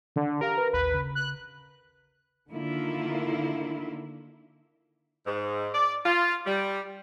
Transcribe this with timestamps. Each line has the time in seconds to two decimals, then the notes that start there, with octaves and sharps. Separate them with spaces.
0.16 D3
0.41 G4 A#4 F5
0.57 B4
0.73 A1 D#2 B4
0.94 C#3
1.15 F#6
2.49 D3 D#3 A#3 E4 F4
5.26 G#2
5.74 D5
6.06 F4
6.46 G3